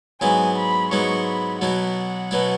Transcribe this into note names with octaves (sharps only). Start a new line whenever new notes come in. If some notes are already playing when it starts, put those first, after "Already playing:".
G#2 F#3 B3 E4 G#5
B5
G#2 F#3 B3 E4 C#6
B5
B2 F#3 B3 E4 F#5
B2 F#3 B3 E4